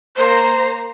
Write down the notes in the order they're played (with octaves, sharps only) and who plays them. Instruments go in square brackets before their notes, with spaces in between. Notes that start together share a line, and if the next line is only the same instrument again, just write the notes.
[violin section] A#3 A#5 [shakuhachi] C5